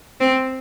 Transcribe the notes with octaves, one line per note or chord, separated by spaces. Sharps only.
C4